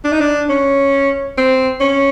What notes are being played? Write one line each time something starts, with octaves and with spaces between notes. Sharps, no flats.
D4
D#4
D4
C#4
C4
C#4